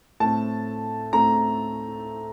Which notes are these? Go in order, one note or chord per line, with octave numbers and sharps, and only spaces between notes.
A2 A3 C4 A5
A2 A3 C4 A#5